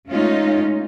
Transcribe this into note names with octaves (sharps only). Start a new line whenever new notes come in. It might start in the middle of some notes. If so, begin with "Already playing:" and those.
G#3 A3 C#4 D#4 F4